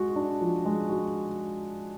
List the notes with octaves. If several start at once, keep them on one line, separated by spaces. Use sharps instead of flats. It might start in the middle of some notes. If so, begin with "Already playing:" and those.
Already playing: G#3 F#4
D4
F3
G#3
F#4